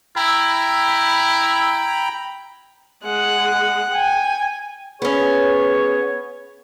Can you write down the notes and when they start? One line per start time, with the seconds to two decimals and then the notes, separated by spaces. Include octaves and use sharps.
0.16 E4 G5 A#5 B5
3.04 G#3 F#5
3.92 G5 G#5
5.02 B3 C#4 G#4 C#5